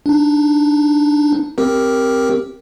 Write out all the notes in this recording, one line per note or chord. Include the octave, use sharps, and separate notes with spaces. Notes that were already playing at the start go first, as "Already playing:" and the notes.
D4 D#4
C4 G4 A#4